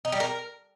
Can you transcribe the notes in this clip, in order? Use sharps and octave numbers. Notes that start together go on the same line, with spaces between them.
D#4
G3
A#4